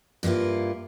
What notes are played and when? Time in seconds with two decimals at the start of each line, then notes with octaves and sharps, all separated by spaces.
0.23 G2 A#3 B3 E4 F4